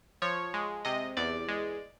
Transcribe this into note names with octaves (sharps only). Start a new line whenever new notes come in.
F3 C#5
G#3
C3 D#5
E2 D5
G#3